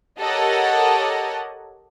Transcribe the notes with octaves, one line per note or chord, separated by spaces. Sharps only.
G4 A4 A#4 C#5 D#5 F#5